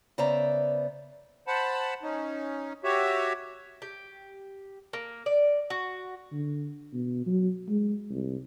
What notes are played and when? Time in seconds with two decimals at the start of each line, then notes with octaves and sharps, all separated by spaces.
0.18 C#3 B3 C5 D5 E5 A#5
1.47 C5 F#5 A5 B5
2.03 C#4 D#4
2.84 F#4 G4 C#5 E5
3.82 G4
4.93 A#3
5.26 D5
5.70 F#4
6.32 D3
6.93 B2
7.26 F#3
7.68 G#3
8.10 C2